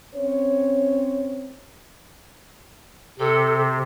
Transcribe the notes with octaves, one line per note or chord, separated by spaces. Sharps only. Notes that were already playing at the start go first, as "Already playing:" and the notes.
C4 C#4 C5 C#5
C3 A4